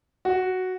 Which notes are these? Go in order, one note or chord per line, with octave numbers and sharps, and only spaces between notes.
F#4